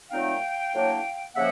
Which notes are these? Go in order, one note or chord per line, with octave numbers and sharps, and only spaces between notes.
A#2 F#3 A3 C4 D#4 F5 G5
A2 F#3 A#3 D4
C#3 F3 A#3 E5 F#5